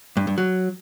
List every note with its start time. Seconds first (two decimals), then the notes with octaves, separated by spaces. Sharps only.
0.17 G2
0.27 G2
0.38 F#3